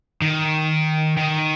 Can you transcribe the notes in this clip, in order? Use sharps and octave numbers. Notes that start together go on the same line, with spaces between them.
D#3
D#3